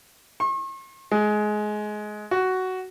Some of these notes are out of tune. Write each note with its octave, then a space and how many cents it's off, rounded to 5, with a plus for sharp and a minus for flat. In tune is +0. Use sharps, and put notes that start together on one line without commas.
C#6 -45
G#3 +20
F#4 +10